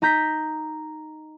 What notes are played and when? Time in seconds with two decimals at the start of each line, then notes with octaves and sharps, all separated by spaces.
0.02 D#4 A#5 G6 B6